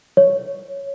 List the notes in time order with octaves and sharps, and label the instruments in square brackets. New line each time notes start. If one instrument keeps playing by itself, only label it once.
[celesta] C#5